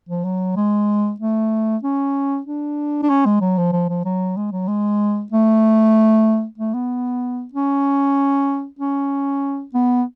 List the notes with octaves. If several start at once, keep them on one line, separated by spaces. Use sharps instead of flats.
F3
F#3
G#3
A3
C#4
D4
D4
C#4
G#3
F#3
F3
F3
F3
F#3
G#3
F#3
G#3
A3
A3
B3
C#4
C#4
B3